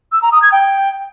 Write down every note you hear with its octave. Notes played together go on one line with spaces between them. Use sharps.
E6
A#5
D#6
G#6
G5